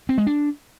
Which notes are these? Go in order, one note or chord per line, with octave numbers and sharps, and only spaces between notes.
C4
G#3
D4